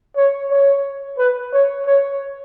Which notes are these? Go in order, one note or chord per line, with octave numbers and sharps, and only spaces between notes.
C#5
C#5
B4
C#5
C#5